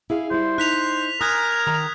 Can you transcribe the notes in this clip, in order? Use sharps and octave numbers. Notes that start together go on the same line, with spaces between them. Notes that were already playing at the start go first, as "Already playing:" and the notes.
E4 G#4 F5
G3 E4 C5
D#4 F#6 B6 F7
A#4 G#5 A#5 D#6 F#6 G#6
D#3 A#5